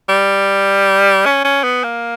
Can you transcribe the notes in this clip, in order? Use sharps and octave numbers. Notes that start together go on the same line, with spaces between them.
G3
C#4
C#4
B3
A#3